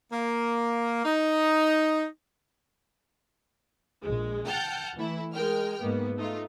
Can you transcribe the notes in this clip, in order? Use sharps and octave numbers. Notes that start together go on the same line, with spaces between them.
A#3
D#4
A#1 G#3
F#5 G5 A5 F6 G6
E3 A3 E4
G#3 A#4 G5 F6
G#2 A#3 B3
A3 D#4 F4